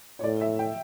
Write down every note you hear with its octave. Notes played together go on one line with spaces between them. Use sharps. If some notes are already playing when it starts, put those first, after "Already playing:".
C#5
A2 D5
E5
G5